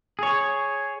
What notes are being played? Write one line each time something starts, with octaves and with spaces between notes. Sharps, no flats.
G#4 C#5